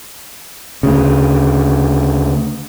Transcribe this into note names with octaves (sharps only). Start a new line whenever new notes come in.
D2 C#3